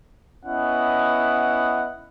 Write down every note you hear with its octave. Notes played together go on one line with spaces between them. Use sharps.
B3 C#4 E4 D#5 F#5